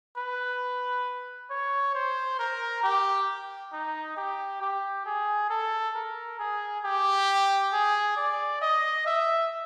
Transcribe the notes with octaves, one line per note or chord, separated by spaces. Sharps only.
B4
C#5
C5
A#4
G4
D#4
G4
G4
G#4
A4
A#4
G#4
G4
G#4
D5
D#5
E5